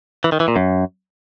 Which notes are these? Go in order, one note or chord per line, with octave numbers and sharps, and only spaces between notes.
E3
D#3
E3
A#2
F#2